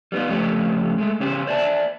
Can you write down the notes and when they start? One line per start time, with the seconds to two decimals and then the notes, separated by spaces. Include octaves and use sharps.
0.12 G3 B3 D#4 F4
0.28 F2 C#3 A3 G4 C#5
0.98 G#3 A3
1.20 C#3 C#4 G4 C5 C#5
1.47 C5 D5 E5 A5